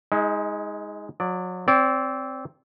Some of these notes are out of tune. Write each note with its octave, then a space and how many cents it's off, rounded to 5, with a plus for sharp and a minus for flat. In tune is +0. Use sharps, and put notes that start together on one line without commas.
G#3 +0 D#4 +40
F#3 -30 D5 +0
C4 +0 D5 -35